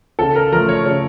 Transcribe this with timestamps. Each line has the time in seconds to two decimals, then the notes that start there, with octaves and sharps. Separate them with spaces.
0.19 C#3 A4
0.36 A#4
0.52 F3 A3 A#4
0.69 C#5
0.85 C#3 C#5